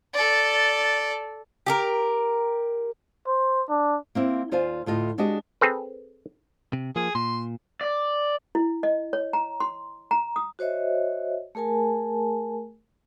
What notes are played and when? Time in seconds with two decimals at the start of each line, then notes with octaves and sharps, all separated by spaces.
0.14 A4 D5
1.66 G4 G#4 A#4
3.27 C5
3.69 D4
4.15 A#3 C4 E4
4.51 D#2 F4 C5 D5 F5 G#5
4.86 D2 A2 F4 D#5
5.18 G#3 D4 F#4 G4 D#5
5.61 C4 G#4 A4 B4
6.73 C3
6.96 F3 A#3 G#4
7.15 A#2 C6
7.81 D5
8.55 E4
8.83 D#5
9.13 C#5
9.33 A#5
9.60 C6
10.11 A#5
10.36 D#6
10.59 F#4 C5 C#5 D#5 E5
11.55 A3 G#4 A#4 G#5 A5